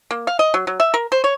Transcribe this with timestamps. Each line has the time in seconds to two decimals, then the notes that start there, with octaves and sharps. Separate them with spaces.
0.11 A#3
0.27 F5
0.39 D#5
0.54 F#3
0.67 F#3
0.80 E5
0.94 A#4
1.12 C5
1.24 C#5